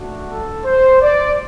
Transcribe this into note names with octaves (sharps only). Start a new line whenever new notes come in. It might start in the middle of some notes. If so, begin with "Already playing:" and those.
Already playing: A3 D4 F#4
A4
C5
D5